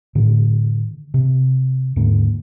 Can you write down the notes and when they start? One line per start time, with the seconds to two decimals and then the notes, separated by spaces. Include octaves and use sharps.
0.15 A2 D3 D#3
1.14 C3
1.96 D#2 G#2 D3 A#3